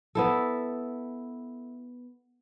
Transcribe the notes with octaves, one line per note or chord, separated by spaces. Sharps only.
B3 E4 A4